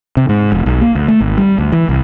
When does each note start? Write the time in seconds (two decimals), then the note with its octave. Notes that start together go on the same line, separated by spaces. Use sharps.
0.17 C3
0.29 G#2
0.52 E1
0.66 B1
0.81 A#3
0.95 D2
1.08 A3
1.20 G#1
1.38 G3
1.58 D2
1.72 E3
1.89 C2